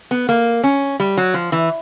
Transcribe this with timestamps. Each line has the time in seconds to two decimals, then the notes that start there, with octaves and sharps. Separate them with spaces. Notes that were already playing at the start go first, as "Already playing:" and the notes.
0.11 B3
0.29 A#3
0.64 C#4
1.00 G3
1.17 F#3
1.34 F3
1.52 E3